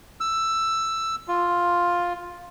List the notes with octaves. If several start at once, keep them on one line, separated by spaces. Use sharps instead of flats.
E6
F4